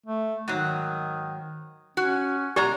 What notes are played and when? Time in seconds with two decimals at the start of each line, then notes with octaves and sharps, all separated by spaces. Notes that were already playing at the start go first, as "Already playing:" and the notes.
0.06 A3
0.48 G#2 D#3 F#3
1.97 C#4 F#4
2.56 B2 G#3 G4 D5 A#5